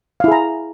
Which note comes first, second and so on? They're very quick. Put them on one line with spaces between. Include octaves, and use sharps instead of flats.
F5 E4 G#4 A#5